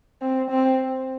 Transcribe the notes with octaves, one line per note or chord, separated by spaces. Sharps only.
C4
C4